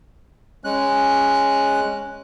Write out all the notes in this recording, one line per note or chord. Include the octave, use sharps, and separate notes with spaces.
G#3 C#4 F#6